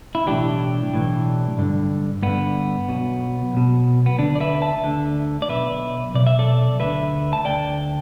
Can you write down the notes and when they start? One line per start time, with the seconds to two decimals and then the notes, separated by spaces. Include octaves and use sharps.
0.15 E4
0.26 B1 A2 E3 D4 G4
0.92 B1 A2 E3
1.58 G2 D3
2.23 G2 D3 B3
2.88 B1 B2
3.53 B1 B2
4.06 B3
4.18 D2 D3 D4
4.35 D5
4.40 B4 E5
4.62 E5 A5
4.84 D2 D3
5.42 D5
5.49 B1 B2 B4 E5
6.14 B1 B2 D5
6.27 E5
6.39 A4 D5
6.80 D2 D3 B4 E5
7.33 A5
7.45 D2 D3 D5 G5